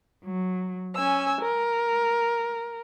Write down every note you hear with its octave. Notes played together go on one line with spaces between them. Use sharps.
F#3
C#4 G#5 E6
A#4